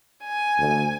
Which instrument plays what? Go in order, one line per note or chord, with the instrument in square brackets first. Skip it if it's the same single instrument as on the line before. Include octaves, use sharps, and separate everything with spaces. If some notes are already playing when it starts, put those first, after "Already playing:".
[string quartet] G#5
[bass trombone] D2